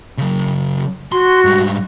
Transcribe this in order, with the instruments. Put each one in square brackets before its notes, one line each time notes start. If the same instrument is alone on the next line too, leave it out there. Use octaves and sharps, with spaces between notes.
[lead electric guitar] C#3 F#3
[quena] F#4 [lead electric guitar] C6
[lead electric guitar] G#2 G3